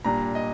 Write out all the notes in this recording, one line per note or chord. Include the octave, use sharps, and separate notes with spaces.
A#2 G3 D4 A#5
D#5